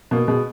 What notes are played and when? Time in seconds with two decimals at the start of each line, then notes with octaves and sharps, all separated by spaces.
0.11 B2 A#3
0.27 B2 G#3